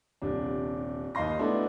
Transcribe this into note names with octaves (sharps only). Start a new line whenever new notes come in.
D#1 C3 D4
D#2 D#4 D#5 F5 C6 A#6
A3 B3 D4 E4 F#4